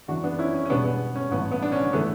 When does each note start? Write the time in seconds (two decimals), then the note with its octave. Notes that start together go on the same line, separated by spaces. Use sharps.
0.08 F#2 E3 B3 D4 F#4
0.23 B3 D4
0.39 C#4 E4
0.54 C#4
0.65 C#4
0.70 E1 E2 B2 G3 B3 D4
0.85 B3
1.16 C#4
1.31 A1 G2 E3 B3
1.51 B3
1.62 D4
1.72 C#4
1.93 E3 A3 B3 D4